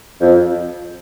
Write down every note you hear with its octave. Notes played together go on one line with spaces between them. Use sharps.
F2